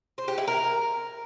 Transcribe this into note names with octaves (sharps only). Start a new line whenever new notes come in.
C5
G4
E4
A#4